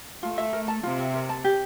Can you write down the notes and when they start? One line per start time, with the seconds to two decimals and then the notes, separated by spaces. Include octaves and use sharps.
0.23 A3 F4
0.38 E5
0.53 A#4
0.68 A5
0.83 C3 F4
0.99 E5
1.14 A#4
1.29 A5
1.44 G4